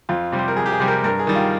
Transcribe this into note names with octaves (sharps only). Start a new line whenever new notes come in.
F2 F4
C3 G3
C5
A#4
F2 G#4
G4
G#4
C3 G3
A#4
G2 A#4
G#4
D#3 G3
F4